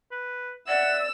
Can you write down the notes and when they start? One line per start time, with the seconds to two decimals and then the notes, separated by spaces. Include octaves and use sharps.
0.11 B4
0.68 D5 E5 F#5 E6